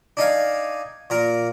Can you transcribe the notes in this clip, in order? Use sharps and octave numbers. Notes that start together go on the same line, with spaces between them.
D4 D#4 F5 G#5
A#2 A#4